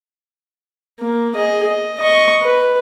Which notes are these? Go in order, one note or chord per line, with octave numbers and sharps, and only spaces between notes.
A#3
G#4 D#5
D#5
D#5 C#6
B4